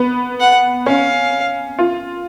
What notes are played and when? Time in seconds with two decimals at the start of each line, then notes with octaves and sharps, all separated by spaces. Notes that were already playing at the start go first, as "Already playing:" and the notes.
Already playing: B3
0.40 F#5
0.86 C#4 F5
1.79 F4